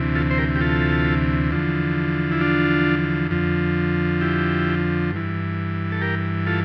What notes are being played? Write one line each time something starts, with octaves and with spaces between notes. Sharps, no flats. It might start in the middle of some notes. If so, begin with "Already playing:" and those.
Already playing: D2 C3 E3
F4 A4
C5
G4 A#4
G4
F4 A4
E2 D3 F3
E4
D4 F4
F2 D3 F3
E4 G4
G2 E3
A4
G4 A#4
F4 A4